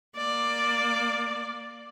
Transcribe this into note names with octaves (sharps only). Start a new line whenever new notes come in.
A#3 D5